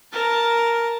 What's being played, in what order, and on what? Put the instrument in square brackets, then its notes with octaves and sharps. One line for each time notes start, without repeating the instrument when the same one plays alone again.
[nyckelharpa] A#4 A5